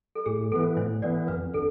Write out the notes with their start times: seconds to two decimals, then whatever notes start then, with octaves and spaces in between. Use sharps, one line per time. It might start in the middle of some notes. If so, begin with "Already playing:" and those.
0.15 A4
0.26 A2 G#4
0.52 E3 B3 A4
0.76 A2 C5
1.02 E3 B3 D5
1.28 F2 B4
1.54 D3 A4